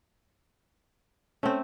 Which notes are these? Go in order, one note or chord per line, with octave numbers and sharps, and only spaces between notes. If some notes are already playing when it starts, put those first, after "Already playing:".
A3 C4 C#4